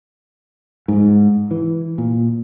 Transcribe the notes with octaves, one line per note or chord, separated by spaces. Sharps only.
G#2
E3
A#2